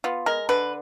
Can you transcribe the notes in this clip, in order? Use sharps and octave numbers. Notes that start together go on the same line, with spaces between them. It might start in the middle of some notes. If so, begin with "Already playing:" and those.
B3 F4
G#3 A#4
D3 B4